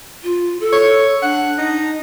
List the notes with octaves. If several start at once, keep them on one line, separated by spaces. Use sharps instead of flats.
F4
A4
C#5
D4 F#5
D#4